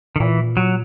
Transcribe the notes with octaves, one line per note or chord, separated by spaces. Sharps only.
D#3
A#2 E3
F#3